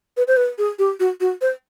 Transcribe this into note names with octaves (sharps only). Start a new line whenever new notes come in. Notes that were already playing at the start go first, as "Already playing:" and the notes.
B4
C5
B4
G#4
G4
F#4
F#4
C5